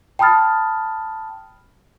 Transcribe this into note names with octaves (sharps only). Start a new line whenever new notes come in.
G5 A5 B5 D#6 F6 A6